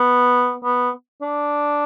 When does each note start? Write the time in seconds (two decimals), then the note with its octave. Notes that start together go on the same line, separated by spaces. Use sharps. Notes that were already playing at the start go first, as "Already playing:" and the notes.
Already playing: B3
0.64 B3
1.22 D4